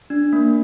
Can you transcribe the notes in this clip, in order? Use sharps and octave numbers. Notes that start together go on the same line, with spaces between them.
D4
A#3